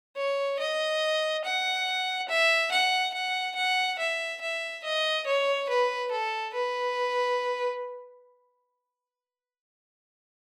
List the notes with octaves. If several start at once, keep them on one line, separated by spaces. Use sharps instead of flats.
C#5
D#5
F#5
E5
F#5
F#5
F#5
E5
E5
D#5
C#5
B4
A4
B4